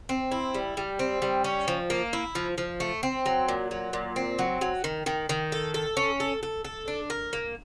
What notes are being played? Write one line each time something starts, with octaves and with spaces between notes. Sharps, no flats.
C4
E4
G3
G3
C4
G3
C#4
F3
A#3
E4
F3
F3
A3
C4
F#3
A#2
F#3
A#2
C4
F#3
F#3
D#3
D#3
D#3
A4
A4
C#4
A4
A4
A4
D4
A#4
A#3